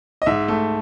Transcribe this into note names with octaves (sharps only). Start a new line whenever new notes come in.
D#5
G#2 E5
A3